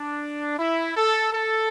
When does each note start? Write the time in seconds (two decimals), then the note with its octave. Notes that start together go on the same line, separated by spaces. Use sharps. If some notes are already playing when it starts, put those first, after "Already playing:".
Already playing: D4
0.58 E4
0.96 A4
1.33 A4